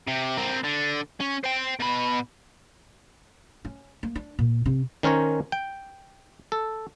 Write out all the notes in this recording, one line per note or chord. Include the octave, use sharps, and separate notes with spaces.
C3
C4 A#4
D3
C#4
C5 G5
B2 B5
C#4
A#3
D4
A#2
C3
D#3 C#4 A#4 C5 C#5
G5
A4